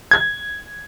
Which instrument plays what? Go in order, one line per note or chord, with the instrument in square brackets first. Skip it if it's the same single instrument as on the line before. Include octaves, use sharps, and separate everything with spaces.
[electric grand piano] G#6